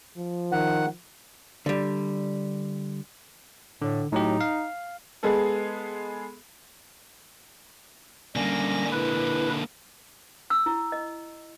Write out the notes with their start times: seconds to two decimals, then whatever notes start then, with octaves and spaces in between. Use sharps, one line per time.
0.17 F3
0.52 D#3 F#5
1.66 D3 G3
3.82 A2 D3
4.12 A2 F#3 D#4 G4
4.41 F5
5.23 G#3 B3 G#4 A4
8.36 D3 G3 A#3 C#4 A#6
8.93 E4 B4
10.50 E6
10.66 E4
10.92 D#5